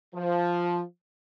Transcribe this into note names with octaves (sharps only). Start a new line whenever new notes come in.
F3